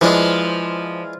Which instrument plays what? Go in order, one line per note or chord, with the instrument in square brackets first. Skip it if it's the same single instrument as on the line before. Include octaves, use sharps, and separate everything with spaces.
[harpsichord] E3 G#3 D4 [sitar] F3